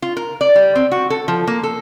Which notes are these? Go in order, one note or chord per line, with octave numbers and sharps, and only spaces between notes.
F4
A#4
D5
G3
C4
F#4
A4
F3
A#3
A4